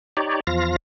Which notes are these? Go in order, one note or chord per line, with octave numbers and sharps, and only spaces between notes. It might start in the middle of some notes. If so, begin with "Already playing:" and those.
D#4 G4 C#5 D5
E2 F3 F4 F5 A#6